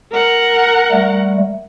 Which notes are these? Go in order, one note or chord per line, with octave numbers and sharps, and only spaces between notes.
A#4 F#5
G3 A3